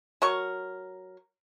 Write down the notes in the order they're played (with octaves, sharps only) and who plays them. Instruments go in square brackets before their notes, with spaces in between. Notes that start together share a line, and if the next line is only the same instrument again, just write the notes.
[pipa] F#3 A#4 C#6